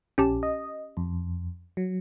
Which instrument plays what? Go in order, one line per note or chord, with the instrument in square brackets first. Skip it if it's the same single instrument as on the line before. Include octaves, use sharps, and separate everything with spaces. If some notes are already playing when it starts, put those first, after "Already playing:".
[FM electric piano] A#1 [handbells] C#4 G4 A5
[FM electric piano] D#5
F2
F#3